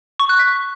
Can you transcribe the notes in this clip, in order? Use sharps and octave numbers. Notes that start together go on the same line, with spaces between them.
C#6
F#6
B6